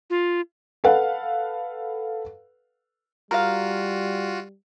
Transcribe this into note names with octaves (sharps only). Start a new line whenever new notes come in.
F4
A4 B4 F5 F#5
G3 F4 F#4 A#4 F5